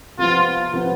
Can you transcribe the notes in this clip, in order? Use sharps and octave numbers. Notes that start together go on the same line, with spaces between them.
C3 F3 B3 F4
C3 F3 B3